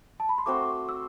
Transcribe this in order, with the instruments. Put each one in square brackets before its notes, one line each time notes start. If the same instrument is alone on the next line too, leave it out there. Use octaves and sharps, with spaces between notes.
[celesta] A5
B5
C6
[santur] A3 C4 F#4 C5 [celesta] D6
[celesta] E6